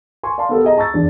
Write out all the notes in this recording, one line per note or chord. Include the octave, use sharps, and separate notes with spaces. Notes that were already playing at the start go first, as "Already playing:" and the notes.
G#5 C6 C#6
D5 F5 A5 C6
B3 G4 A4 A#4
G#4 D#5 A#5
A5 A#5 C#6 E6 A6
E2 D4